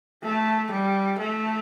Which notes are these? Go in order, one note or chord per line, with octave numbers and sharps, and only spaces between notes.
A3
G3
A3